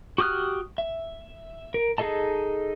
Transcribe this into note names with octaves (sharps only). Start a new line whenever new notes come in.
F#4 G4 D#6 F6 F#6
E5
A#4
D#4 G#4 A4 D#5 A5